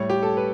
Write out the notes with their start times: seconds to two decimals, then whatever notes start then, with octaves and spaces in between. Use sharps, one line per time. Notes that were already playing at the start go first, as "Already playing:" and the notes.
Already playing: A2 G3 C#5
0.10 G4
0.23 A4
0.37 B4